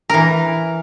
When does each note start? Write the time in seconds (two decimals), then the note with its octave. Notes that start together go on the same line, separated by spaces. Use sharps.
0.10 E3 A#4